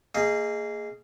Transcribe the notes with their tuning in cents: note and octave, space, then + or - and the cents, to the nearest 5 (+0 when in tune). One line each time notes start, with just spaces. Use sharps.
A#3 -30 G#4 +0 D#5 +0